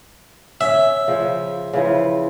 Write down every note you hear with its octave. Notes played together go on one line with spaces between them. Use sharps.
C#4 E5
C#3 F3
C#3 E3 F3